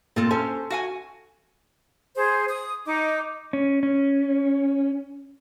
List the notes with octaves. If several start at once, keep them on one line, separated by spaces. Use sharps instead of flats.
A#2 C4 F4 A4
C#4 A4 C5
F#4 F5 G#5
G#4 C5
D#6
D#4 D6
C#4
C#4